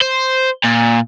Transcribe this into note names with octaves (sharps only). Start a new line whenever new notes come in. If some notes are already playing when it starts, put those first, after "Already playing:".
C5
A#2